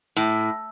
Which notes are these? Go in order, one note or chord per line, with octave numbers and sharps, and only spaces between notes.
A2